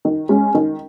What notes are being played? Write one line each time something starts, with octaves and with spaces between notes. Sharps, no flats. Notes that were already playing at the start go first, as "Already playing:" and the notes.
D#3
G#3 C#4
D#3